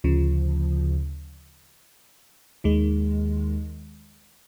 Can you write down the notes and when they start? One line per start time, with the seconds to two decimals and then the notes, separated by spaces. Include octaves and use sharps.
0.04 D2 C#3 F3
2.64 D#2 D#3 G#3